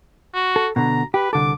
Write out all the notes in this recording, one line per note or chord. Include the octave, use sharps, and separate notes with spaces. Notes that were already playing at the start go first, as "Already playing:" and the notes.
F#4
A4
B2 D3 A#5
G4 B4
C2 D3 A4 D6